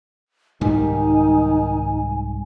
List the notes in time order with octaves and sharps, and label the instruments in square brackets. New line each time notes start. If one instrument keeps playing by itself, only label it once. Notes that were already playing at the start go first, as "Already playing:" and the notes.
[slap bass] C2 G#2 G3 [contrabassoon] D#3 [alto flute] D#4 [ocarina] G#5